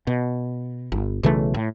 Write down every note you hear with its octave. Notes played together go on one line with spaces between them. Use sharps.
B2
G1
B1 C#3 E3 A3
A2